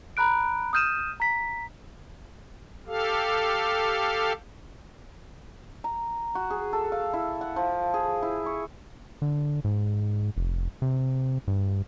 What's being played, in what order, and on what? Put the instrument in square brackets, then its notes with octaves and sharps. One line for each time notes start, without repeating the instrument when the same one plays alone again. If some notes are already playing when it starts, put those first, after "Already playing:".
[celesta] A#5 B5 F#6 D7
D#6 F6 G6 D#7 E7
A#5 B6
[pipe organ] G4 A4 F5
[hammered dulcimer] A#5
F#4
G#4
A4
F5
E4
F#5
F3
G#4
E4
C#6
[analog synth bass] D3
G#2
F1
C3
G2